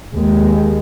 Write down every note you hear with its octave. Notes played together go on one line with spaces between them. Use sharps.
D#2 G#3